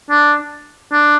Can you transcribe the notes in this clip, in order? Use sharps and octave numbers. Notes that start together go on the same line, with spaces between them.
D4
D4